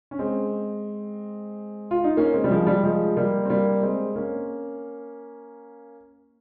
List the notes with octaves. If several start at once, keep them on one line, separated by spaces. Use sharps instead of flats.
C#4
G#3 C4
F4
D#4
A#3 C#4
G#3 C4
G3
F3 G#3
G3
F3 G#3
G3 A#3
C4
G3 A#3
G#3 C4
A#3 C#4